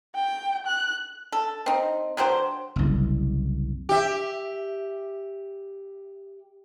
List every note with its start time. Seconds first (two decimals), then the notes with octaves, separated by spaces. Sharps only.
0.15 G5
0.67 F#6
1.32 A4
1.66 C4 D#4
2.17 D3 F#3 G4 C5
2.76 F#1 C2
3.89 G4 E5